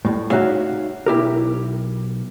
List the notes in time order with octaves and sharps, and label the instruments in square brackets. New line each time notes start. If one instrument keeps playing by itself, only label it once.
[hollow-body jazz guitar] A2 G3
D#4 E4 F#4 C#5 E5 F5
B1 E4 G4 A#4